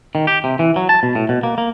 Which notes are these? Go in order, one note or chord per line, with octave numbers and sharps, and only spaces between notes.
D#3
G4
C3
E3
F#3
A5
B2
A2
B2
A#3
A#3